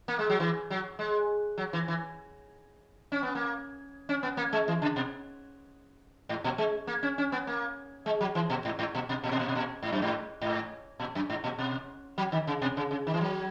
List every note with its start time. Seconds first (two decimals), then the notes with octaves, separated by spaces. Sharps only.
0.08 A#3
0.19 G#3
0.30 F#3
0.40 E3
0.70 F#3
0.99 G#3
1.58 F#3
1.73 E3
1.88 E3
3.12 C#4
3.23 B3
3.35 A#3
4.09 C#4
4.23 B3
4.37 A#3
4.53 G#3
4.68 E3
4.82 C#3
4.96 B2
6.29 G#2
6.44 A#2
6.58 G#3
6.87 A#3
7.03 C#4
7.18 C#4
7.32 B3
7.47 A#3
8.06 G#3
8.21 F#3
8.35 E3
8.50 A#2
8.65 G#2
8.79 G#2
8.95 A#2
9.09 B2
9.24 A#2
9.32 B2
9.39 A#2
9.48 B2
9.55 A#2
9.82 G#2
9.92 F#2
10.02 G#2
10.42 G#2
11.00 A#2
11.15 F#2
11.30 G#2
11.44 A#2
11.58 B2
12.18 F#3
12.32 D#3
12.47 C#3
12.62 B2
12.77 C#3
12.91 C#3
13.07 D#3
13.14 E3
13.21 F#3